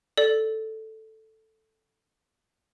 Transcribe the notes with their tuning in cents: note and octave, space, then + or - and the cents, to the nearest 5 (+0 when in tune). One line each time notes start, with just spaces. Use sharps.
A4 +0 D5 +0